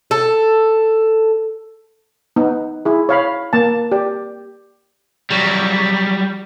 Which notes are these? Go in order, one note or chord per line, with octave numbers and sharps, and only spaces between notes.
A4
B3 D#4
E4 G#4
C#5 F5 B5
A#3 A5
G4 D5
F#3 G3